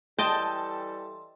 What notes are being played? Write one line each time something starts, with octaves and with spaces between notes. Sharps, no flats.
E3 G3 A4 D#5 G5 A5 C6